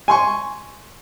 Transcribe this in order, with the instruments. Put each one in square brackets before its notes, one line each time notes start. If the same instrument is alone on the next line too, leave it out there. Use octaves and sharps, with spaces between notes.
[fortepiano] G#5 C6 C#6